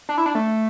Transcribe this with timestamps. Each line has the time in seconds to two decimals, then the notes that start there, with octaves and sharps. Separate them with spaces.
0.09 D4
0.18 E4
0.26 D4
0.35 A3